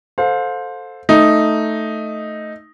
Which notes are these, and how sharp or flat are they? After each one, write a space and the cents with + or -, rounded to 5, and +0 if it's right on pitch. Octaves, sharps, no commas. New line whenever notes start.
A4 +0 C5 +0 F5 +35
A3 +0 D#4 +0